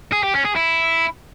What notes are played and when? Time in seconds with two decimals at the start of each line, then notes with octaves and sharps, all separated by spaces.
0.12 G#4
0.23 G4
0.34 C#4
0.45 G#4
0.56 E4